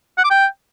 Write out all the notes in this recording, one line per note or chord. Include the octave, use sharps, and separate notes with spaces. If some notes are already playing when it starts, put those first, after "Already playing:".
F#5
D6
G5